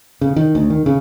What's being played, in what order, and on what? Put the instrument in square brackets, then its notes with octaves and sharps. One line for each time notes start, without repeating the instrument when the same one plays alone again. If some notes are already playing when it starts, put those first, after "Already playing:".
[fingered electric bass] C#3
D#3
D2
D#3
C#3